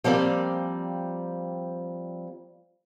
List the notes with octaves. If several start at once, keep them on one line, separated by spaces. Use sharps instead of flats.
F3 G3 A#3 C4 D5